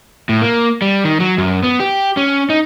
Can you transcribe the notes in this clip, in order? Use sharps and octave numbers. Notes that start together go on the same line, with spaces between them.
A2
A#3
G3
D#3
F#3
F#2
B3
G4
C#4
D#4